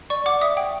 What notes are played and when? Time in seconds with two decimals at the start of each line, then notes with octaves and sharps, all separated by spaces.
0.10 D5 C#6
0.26 F#5 D6
0.41 E5 D#6
0.57 G5